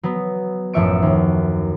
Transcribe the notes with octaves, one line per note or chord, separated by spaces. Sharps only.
F#3 B3
A1 F#2 F3 E5 C#6 D7
D#2